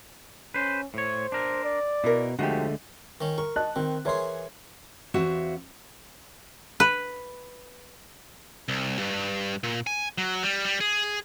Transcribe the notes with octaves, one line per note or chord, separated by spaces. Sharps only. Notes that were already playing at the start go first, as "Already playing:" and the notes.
C#4 B4 C5
A2 C5 C#5
D4 A#4
D5
B2 E4 A#4
D3 F3 G#3 A3 F#4 G4
D#3 C#4
A#4 C#6
D#5 A5 F#6
D#3 C4
E3 G#4 A#4 C#5 C6
E2 C4 F#4 E5 F5
B4
C2
G2
A#2
G#5
F#3
G3
G3
G#4